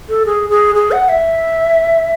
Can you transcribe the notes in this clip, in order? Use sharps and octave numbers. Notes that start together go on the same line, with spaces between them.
A4
G#4
G#4
G#4
F#5
E5